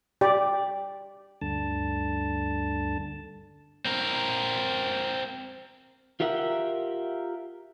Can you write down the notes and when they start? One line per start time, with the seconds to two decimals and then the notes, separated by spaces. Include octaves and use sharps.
0.21 G4 D5
1.41 D2 G2 D3 A5
3.85 C4 A#4
6.20 F4 G4 A#4 E5 F#5